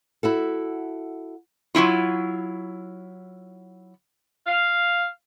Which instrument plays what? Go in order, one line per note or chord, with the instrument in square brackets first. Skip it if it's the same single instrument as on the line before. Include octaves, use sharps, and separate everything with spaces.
[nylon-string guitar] E4 F#4 A4
[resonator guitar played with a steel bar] F#3 C4 E4 F4
[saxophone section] F5